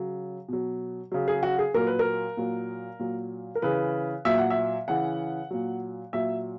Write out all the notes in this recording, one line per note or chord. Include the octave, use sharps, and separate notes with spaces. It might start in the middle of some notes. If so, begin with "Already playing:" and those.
Already playing: C#3 F#3
B2 F#3
C#3 F#3
G#4
F#4
G#4
A#2 F#3 A#4
B4
A#4
A#2 F#3
A#2 F#3
A#4
C#3 E3 B4
A#2 F#3 E5
F#5
E5
C#3 E3 F#5
A#2 F#3
A#2 F#3 E5